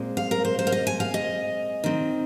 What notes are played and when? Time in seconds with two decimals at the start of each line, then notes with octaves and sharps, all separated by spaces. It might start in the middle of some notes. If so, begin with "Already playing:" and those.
Already playing: A#2 G#3 C4
0.17 F5
0.31 A#4
0.45 C5
0.59 C5
0.67 F5
0.72 D#5
0.87 G#5
1.00 F5
1.14 D#5
1.84 D#3 C4